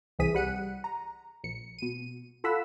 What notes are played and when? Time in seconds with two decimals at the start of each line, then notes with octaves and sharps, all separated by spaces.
0.19 C2 E3 C4 G#4 B6 D#7
0.35 G3 F#5 C#7 D#7
0.84 A#5
1.44 A#1 C#7
1.79 B2 D#7
2.44 F4 A4 F#5 B5 E6 B6